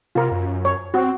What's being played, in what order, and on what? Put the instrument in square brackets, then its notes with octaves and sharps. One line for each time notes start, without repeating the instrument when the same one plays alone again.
[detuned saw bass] C3 [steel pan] F4 A#4
[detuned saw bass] F#2
[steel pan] C#5
[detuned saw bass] C4 [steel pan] F#4